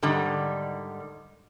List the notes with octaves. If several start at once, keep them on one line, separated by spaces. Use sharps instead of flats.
G#2 D3 D#3 G3